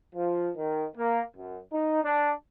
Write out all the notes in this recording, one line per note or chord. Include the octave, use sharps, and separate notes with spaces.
F3
D#3
A#3
F#2
D#4
D4